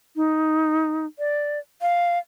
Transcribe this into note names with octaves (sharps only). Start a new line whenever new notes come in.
D#4
D5
F5